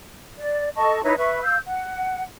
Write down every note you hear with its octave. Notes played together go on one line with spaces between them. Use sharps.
D5
A4 D#5 A5 C#6
D#4 E4 B4 C#5
B4 E5 B5 C#6
F5 E6 G6
F#5